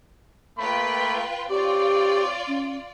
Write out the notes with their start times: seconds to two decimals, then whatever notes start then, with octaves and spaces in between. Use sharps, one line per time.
0.58 A3 A#3 F4 B4 G5 B5
1.49 C4 F4 G4 C#5 D5 D6
2.48 C#4